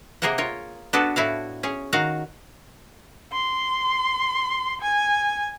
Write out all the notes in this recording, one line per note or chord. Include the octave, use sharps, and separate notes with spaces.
C3 A#3 G#4 A#4 C5 F#5
F4 A#4 C#5
B3 D4 F#4 A4 A5
A2 E4 F#4 F5
C#4 G#4
D#3 F#4 F5 F#5 A#5
C6
G#5